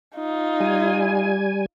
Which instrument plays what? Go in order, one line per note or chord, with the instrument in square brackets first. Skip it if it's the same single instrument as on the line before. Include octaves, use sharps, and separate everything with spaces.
[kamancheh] D#4 F4
[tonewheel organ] G3 G#5